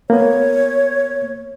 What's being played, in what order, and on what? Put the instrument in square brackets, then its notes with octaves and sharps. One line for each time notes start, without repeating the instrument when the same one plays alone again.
[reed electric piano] A#3 B3 [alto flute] C#5